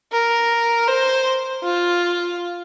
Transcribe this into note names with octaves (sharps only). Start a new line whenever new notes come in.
A#4
C5
F4